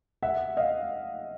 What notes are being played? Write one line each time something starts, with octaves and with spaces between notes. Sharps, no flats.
E5 F#5
D#5 F5